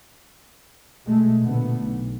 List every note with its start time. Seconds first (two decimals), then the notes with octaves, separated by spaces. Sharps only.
1.04 B2 G#3 A3
1.41 A#1 B2 D3 A3 B3
1.81 B1